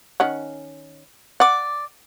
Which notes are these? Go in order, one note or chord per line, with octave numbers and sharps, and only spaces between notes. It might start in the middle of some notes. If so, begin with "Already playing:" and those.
D#3 C#4 F#5
D5 F#5 D6